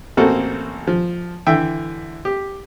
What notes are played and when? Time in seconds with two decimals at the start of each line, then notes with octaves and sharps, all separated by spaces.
0.17 A1 A#3 C4 F#4 A4
0.88 F3
1.47 D3 E3 E5 G5
2.25 G4